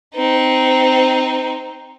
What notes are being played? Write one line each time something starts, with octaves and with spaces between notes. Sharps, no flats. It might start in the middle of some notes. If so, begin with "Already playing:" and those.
C4 D#4